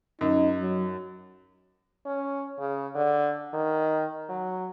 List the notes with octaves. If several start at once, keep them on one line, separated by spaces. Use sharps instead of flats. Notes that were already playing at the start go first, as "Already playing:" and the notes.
F#2 D#4
F#3
C#4
C#3
D3
D#3
F#3